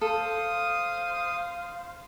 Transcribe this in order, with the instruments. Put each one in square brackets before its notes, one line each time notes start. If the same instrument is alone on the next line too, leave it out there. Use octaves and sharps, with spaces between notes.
[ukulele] A4 [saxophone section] C5 F5 [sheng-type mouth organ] D#6